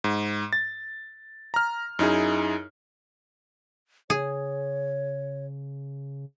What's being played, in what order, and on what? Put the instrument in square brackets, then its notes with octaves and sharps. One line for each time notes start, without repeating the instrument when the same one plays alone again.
[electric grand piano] G#2
A6
A#5 F6
F#2 D#4 E4 G#4
[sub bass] C#3 [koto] G#4 [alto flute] C#5